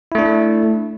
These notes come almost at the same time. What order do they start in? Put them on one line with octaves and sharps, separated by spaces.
E4 A3 D4